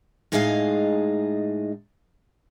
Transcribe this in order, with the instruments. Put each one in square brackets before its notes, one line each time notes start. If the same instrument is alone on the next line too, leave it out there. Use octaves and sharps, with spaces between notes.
[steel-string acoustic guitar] A2 G#3 D#4 G#4 D#5 F5